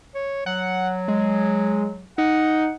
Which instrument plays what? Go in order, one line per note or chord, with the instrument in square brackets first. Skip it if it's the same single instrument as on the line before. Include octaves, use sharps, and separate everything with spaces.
[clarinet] C#5
[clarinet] F#3 [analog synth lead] F#5
[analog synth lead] G#3
[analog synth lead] D#4 [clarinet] F#5